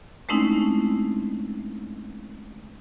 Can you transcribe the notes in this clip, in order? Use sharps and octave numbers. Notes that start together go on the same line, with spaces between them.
G#3 A3 C4 C#4 D#4 E4